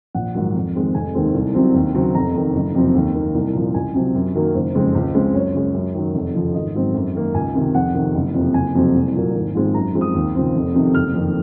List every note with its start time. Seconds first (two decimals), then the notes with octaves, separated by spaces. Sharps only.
0.14 A#1 F#5
0.35 G#2 D#3 F#3
0.54 F2
0.75 D#3 G#3 C4
0.94 F1 G#5
1.14 D#2 D#3 G#3 C4
1.34 C2
1.54 C3 F#3 C4
1.75 D#2
1.94 C#3 F#3 C4
2.15 F1 A#5
2.34 F2 D#3
2.54 F#1
2.75 F2 C3 F#3 C4
2.94 D#2
3.15 D#3 A#3
3.34 C2
3.54 A#2 F3
3.74 C#2 G#5
3.94 C3 F#3 C4
4.14 F#2
4.35 D#3 F#3 A#3
4.54 F#1 C5
4.75 F2 C#3 G#3 C4
4.95 C#2
5.15 C#3 G#3 C4
5.34 F#2 C#5
5.54 C#3 G#3
5.74 F#2
5.95 D#3 F#3
6.15 F1
6.34 F2 C#3 F3
6.54 G#1 D#5
6.74 G#2 F#3 C4
6.94 F#2
7.15 D#3 A#3
7.34 C#2 G#5
7.55 C3 D#3
7.75 F2 F#5
7.95 C3 D#3
8.15 F#1
8.34 F2 C3 F3
8.54 F#1 G#5
8.75 F2 C3 F#3 C4
8.95 C2
9.15 A#2 F#3 A#3
9.35 G#1
9.55 G#2 F3 G#3 C4
9.74 F#2 A#5
9.95 F3 G#3 C4
10.01 D#6
10.15 D#2
10.35 C#3 F3 C4
10.55 F1
10.75 F2 C3 D#3
10.95 F#1 F6
11.14 F2 D#3